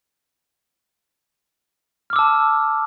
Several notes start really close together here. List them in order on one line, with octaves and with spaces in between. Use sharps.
F6 D6 E6 A5